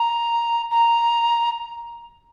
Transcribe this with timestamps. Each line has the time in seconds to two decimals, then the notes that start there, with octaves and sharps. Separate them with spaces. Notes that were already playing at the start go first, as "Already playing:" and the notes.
Already playing: A#5
0.71 A#5